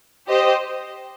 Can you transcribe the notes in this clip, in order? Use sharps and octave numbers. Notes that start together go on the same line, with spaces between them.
G4 C5 D#5